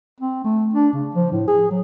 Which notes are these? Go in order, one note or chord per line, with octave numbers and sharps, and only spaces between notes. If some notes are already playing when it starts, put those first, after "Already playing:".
C4
A3
D4
C#3
F3
A2
G#4
F#3